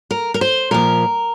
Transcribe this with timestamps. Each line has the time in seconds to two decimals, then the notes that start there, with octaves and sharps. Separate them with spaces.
0.11 A#4
0.34 A#4
0.41 C5
0.71 A#2 F3 A#4